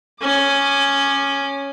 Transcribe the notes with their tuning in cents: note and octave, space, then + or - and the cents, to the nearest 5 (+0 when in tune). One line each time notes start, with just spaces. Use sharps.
C#4 +0 D6 +30